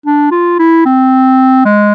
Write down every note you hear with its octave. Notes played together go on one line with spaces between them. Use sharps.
D4
F4
E4
C4
G#3